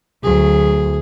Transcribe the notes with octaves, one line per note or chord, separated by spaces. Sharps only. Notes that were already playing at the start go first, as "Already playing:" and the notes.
D2 F#3 G#4